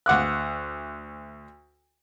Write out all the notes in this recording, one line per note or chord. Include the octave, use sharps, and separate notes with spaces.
D2 F#5 D6 F#6